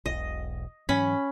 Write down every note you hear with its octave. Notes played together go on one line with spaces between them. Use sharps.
E1 B1 D#5
G#2 E3 F#3 C#4 B5